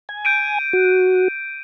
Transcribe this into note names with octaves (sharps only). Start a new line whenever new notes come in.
G#5
G6 D7 D#7
F#4